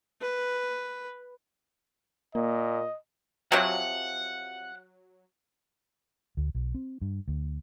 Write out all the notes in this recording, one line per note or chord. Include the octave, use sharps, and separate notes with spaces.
B4
A#2 A#3 D#5
C3 F3 F#3 F#5
D2
B1
C4
G2
D2